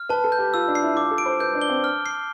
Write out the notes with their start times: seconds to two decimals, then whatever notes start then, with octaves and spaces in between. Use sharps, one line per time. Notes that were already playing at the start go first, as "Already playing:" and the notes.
Already playing: F6
0.09 B4 A5
0.24 A4
0.32 G6
0.38 G4
0.54 F4 E6
0.68 D4
0.75 C7
0.83 E4
0.96 F4 D6
1.11 A4
1.18 D7
1.26 C5
1.40 B4 G6
1.55 D4
1.61 G7
1.70 C4
1.84 F6
2.06 C7